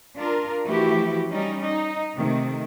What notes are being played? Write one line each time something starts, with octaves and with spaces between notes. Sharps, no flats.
D4 F4 A#4
E3 F3 A3 E4 F#4 G4
G3 C#4 D#4
D#4
C3 D#3 A3